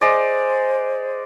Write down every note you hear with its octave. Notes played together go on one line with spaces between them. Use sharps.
G#3 C5 D5